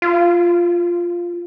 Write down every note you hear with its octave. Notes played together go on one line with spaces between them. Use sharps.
F4